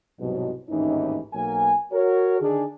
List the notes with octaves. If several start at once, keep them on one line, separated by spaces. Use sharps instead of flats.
C2 G#2 B2 F#3
G#1 D#2 A2 E3 C#4 D#4
B1 F#3 A#3 A#4 G#5
F#4 A#4 C#5
D3 D#3 D4 D#4 G#4